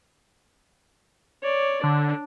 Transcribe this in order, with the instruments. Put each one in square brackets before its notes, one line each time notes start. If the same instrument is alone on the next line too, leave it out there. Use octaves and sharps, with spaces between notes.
[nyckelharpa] C#5 D5
[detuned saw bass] D3 [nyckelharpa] D4